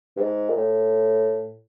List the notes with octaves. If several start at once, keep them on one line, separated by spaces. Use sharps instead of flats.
G2
G#2
A#2
A2